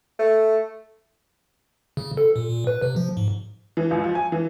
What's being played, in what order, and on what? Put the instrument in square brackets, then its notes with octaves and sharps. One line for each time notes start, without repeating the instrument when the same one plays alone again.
[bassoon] A3
[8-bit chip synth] C#3
A4
A#2
A#2
B4
C3
F3
G#2
[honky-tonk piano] E3
C#2
F3
G#5
E3